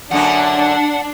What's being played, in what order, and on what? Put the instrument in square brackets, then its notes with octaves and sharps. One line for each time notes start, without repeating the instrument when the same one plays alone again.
[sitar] F#2 D3 A#3 [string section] D4 [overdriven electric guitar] F#5